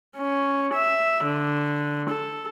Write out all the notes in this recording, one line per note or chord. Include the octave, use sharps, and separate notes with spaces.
C#4
E5
D3
A4